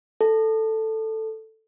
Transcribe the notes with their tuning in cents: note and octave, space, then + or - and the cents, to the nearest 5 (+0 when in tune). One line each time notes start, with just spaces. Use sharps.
A4 +5